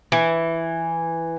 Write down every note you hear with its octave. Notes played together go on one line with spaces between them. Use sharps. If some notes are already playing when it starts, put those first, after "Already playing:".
E3